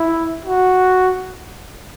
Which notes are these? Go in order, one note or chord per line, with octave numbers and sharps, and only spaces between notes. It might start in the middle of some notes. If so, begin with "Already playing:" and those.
Already playing: E4
F#4